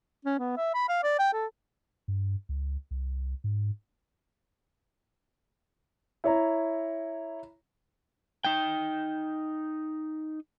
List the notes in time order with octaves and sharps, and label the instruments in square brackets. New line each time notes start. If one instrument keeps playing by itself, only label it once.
[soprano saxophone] C#4
B3
E5
B5
F5
D5
G5
A4
[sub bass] G2
C#2
C2
G#2
[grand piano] E4 C#5 A#5
[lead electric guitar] D#4 G5